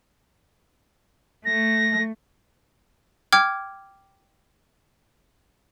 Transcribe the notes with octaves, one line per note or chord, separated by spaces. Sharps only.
A3 A#6
G5 D6 F6 G#6